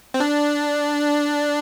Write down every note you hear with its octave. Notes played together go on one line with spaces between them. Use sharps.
C4
D4